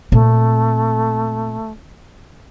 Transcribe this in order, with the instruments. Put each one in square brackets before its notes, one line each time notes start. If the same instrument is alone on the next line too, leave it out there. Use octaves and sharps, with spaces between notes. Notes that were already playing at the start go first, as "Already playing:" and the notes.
[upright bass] A#2 C4 [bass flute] A3